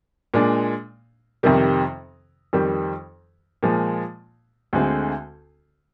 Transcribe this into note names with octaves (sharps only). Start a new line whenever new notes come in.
A#2 G#3 D4
F2 C3 D#3 G3
F2 D#3 G3
A#2 F3 G#3
D2 D3 G#3 C4